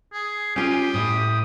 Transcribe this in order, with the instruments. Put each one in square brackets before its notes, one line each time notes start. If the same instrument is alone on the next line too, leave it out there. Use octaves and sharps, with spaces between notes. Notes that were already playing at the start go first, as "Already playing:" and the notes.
[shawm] G#4
[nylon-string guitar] C#4 F4 G#5 [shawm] G4
[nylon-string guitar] A2 A3 [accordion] D#6